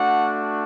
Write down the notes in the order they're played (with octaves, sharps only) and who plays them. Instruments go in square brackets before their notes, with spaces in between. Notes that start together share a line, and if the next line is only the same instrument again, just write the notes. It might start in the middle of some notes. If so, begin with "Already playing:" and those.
Already playing: [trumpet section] A3 D4 F#4 F#5